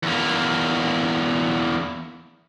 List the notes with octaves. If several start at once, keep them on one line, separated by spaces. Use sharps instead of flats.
E2 A#3